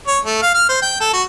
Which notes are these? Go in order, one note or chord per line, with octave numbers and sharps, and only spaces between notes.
C#5
A3
F5
F6
C5
G5
A4
F#4